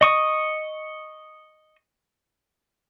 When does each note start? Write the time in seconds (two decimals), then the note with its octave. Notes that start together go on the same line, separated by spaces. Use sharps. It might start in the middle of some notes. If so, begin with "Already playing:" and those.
0.01 D#5 C#6 D#6